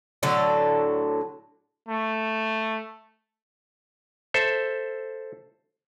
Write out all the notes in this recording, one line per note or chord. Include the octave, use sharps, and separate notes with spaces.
A2 D3 F#3 A4
A3
A4 C5 E5